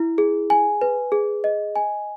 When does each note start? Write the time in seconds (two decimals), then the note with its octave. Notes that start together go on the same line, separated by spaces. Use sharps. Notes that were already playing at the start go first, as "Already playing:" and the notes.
Already playing: E4
0.18 G#4
0.50 G#5
0.81 B4
1.12 G#4
1.44 D#5
1.76 G#5